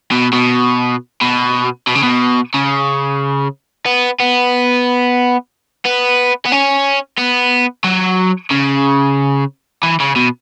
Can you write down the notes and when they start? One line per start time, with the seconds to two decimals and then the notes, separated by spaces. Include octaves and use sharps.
0.12 B2
0.33 B2
1.21 B2
1.87 B2
1.95 C#3
2.03 B2
2.54 C#3
3.86 B3
4.20 B3
5.86 B3
6.45 B3
6.52 C#4
7.18 B3
7.84 F#3
8.50 C#3
9.83 E3
10.00 C#3
10.16 B2